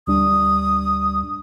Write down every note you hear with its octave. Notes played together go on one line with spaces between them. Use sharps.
D2 G3 D4 D#6